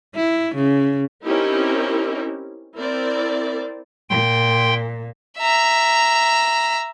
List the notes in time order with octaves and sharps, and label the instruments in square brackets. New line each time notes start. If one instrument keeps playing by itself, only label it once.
[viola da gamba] E4
C#3
[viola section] C4 C#4 D#4 E4 G4 A#4
C4 E4 A#4 D5
[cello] A#2 [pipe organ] G5 C6
[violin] E5 A#5